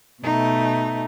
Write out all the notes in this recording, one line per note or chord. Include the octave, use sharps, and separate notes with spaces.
B2 A3 D#4